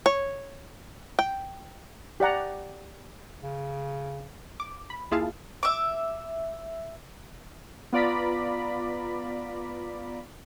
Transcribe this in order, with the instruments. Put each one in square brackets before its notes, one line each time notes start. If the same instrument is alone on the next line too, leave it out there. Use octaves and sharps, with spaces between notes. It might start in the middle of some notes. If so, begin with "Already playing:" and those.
[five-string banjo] C#5
G5
[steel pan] G4 D5 F#5 A#5
[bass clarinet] C#3
[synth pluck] D6
B5
D#2 E4 F4 G#4 F5 A5
[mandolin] E5 D6
[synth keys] B3 F4 D5 A#5 B5